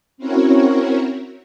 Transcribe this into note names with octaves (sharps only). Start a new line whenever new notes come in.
C4 C#4 E4 F#4 A#4 C#5